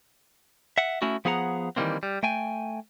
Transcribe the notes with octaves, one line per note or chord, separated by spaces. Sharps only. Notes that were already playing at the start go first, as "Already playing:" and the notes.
E5 F#5
A3 C#4 E4 F#4
F3 B3 G#4 F#5 A#5
D#3 E3 G3 A3 A#3 C4
G3
A3 G5 G#5